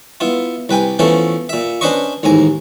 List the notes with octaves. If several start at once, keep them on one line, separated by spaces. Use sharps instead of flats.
B3 E4 F4
C2 B4 G5 G#5
E3 F3 A3 B3 C#4 A4
A#2 E5
C#4 D4 B4 C5 D#5 C#6
A1 D#2 G#2 G#5 A#5